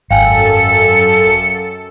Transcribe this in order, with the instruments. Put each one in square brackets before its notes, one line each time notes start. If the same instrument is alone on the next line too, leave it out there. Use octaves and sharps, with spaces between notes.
[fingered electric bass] G#1 [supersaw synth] F#2 A4 [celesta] F5 G5 G#5 [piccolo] C#7